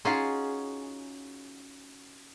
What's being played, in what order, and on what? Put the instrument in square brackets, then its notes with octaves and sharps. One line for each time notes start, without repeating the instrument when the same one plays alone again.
[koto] C#4 D#4 F4 F#4 G#4